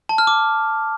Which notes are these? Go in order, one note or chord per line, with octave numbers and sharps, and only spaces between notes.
A5
F6
D6